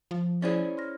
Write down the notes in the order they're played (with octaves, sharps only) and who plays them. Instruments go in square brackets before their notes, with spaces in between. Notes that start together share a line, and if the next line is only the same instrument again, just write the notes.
[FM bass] F3
[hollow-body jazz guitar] C#4 E4 G#4 [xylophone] C5 D5 A6
[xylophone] C6 F6 A#6